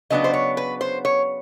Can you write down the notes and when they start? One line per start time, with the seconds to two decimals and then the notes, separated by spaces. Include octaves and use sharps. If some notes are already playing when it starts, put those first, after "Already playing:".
0.10 C#3 F#3 B3 D4 D#5
0.24 C5
0.34 C#5
0.57 B4
0.81 C5
1.05 C#5